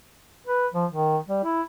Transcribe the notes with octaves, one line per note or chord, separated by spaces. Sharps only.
B4
F3
D#3
G3
E4